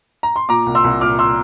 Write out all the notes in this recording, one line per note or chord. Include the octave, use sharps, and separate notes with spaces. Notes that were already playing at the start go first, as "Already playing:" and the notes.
A#5
C6
A#2 A#5 D6
C2
C6 E6
C2
A#2 D6 F6
C6 E6